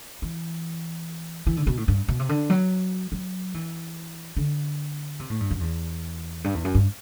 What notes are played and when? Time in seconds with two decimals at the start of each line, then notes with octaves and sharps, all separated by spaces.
0.22 E3
1.47 E3
1.57 D3
1.67 B2
1.77 A2
1.88 G2
2.08 B2
2.19 C3
2.29 D3
2.50 F#3
3.12 F#3
3.54 E3
4.37 D3
5.20 C3
5.30 A2
5.40 G2
5.51 F#2
5.61 E2
6.44 G2
6.54 E2
6.65 F#2
6.75 G2